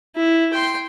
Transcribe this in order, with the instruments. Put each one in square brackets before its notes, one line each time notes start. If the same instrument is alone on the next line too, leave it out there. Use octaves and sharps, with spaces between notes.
[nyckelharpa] E4
G5 C6